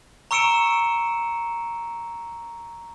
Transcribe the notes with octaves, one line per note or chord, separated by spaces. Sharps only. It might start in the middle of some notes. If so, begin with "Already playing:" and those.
A#5 C#6 E6 C#7 D7 E7